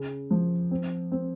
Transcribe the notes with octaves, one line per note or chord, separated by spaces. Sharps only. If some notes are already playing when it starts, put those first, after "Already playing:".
Already playing: C#3
F3
C4
C4